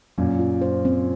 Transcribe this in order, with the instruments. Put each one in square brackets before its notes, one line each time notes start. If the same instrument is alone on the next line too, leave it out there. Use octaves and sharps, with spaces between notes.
[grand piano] F#2 A#2 [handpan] F#3
[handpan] F4
C5
C4